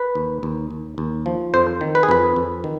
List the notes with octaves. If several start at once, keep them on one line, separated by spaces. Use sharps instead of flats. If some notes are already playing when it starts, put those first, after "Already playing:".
Already playing: B4
D#2
D#2
D#2
D#2
F3
F2 C5
D#3
B4
G#4
F2 B4
F2
D#3